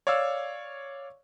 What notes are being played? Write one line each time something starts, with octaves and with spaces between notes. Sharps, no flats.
C#5 D5 F5 C#6 E6